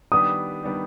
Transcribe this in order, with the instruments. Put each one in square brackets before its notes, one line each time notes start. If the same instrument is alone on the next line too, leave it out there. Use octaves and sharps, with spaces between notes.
[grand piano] D#3 G3 B3 D4 G4 [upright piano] D#6
[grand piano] D#3 G3 B3 D4 G4